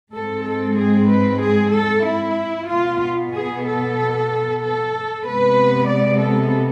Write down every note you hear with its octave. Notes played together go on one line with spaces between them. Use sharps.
G#2 G#3 C4 A4
A4
G#4
B4
G#4
A4
E4
B2 B3 F4
G#4
A4
A4
C3 G#3 B3 B4
D5
A4